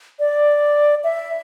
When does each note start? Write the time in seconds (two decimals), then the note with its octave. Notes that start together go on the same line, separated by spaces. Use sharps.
0.19 D5
1.04 E5